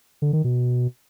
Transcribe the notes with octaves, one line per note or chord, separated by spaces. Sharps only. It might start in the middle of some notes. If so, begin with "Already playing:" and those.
D3
D#3
B2